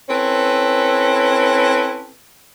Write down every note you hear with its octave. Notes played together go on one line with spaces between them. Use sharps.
C4 C#4 E4 A4 B4